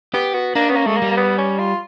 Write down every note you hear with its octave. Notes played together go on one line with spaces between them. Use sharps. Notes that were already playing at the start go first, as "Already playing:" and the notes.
B3 G4
B3 F#4
A#3 D4
B3 C#4
A#3
G#3 A3
A#3
G3
A#3
B3
C#4
F4